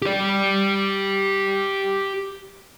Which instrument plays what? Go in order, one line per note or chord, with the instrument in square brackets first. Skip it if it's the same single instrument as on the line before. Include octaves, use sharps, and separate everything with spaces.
[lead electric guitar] G4 D5